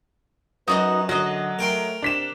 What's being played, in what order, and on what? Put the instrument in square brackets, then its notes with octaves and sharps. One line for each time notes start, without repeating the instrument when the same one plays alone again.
[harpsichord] F#2 [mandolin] D#4 F#4 D#5 [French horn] B4
[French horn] D3 [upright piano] F#3 [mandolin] F#4 D#5
[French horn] A3 [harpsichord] A#4 G5 C6
[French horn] C3 [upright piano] D4 B6 E7